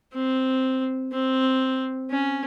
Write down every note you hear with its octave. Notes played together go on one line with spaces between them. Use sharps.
C4
C4
C#4